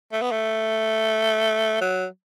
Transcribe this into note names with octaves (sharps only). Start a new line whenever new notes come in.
A3
B3
A3
F#3